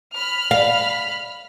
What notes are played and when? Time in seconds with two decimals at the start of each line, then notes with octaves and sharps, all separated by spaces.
0.13 B5 F6
0.51 F5